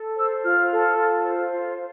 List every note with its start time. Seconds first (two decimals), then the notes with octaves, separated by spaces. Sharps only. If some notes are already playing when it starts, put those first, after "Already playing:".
Already playing: A4
0.16 C5 E6
0.44 F4 F6
0.71 A4
0.98 F4
1.24 C5
1.52 F4